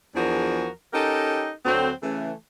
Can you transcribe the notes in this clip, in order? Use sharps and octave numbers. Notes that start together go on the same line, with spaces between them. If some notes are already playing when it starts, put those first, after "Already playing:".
E2 F3 D4 F#4 G#4 A#4
C#4 D#4 G4 A4 A#4 D#5
D2 F#3 C4
C#3 E3 A3